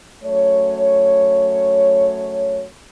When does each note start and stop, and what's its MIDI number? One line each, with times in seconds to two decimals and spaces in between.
0.24 2.64 42
0.24 2.64 57
0.24 2.64 73